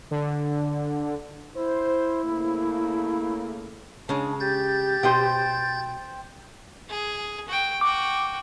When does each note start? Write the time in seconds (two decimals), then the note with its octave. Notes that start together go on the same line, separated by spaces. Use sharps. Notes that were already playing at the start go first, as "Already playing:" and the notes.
0.11 D3
1.56 E4 C5
2.24 C#3 A3 A#3
4.09 C#3 G#3 D4
4.40 G4 G6 A6
5.03 B2 C5 D#5 G5 C6
6.90 G#4
7.48 F#4 G5
7.81 F#4 G5 D6